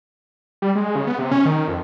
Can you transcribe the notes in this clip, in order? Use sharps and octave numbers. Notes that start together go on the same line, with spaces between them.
G3
G#3
C#3
B3
C3
C#4
D#3
F2